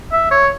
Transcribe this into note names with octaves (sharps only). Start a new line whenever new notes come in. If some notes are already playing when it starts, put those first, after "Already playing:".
E5
C#5